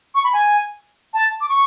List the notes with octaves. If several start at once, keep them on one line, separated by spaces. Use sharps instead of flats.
C#6
B5
G#5
A5
D6
C#6